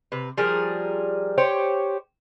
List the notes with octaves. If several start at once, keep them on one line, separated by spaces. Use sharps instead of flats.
C3 B4
F3 G3 G#4 A#4
G4 C5 C#5